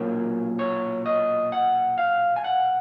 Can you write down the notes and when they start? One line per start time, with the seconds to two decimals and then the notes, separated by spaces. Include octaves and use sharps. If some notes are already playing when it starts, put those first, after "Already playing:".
Already playing: B1 A#2 F#3 C#4 A#4
0.59 C#5
1.06 D#5
1.52 F#5
1.98 F5
2.36 G#5
2.44 F#5